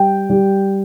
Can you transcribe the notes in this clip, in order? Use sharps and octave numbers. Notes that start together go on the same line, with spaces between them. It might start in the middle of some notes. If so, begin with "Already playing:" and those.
Already playing: G3 G5
G3